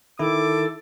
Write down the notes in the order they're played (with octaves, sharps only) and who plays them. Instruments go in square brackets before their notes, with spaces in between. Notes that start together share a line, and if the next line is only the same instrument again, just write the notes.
[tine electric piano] D#3 E4 [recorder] A4 [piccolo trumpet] D6